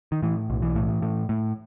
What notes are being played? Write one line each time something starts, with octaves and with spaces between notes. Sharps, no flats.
D#3
A2 E3
B1
E3
A2
A2
A2